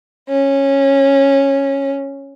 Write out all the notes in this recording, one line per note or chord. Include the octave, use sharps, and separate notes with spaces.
C#4